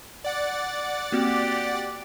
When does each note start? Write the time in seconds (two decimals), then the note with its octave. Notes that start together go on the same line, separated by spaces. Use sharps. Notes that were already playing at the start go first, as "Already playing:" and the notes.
0.24 D5 F#5 A6
1.12 A#3 C4 F#4 G4